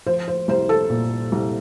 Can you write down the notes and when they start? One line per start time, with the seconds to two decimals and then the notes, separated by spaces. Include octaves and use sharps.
0.07 F3 C5
0.28 C5
0.48 C2 C5
0.69 A4
0.90 A#2
1.32 C2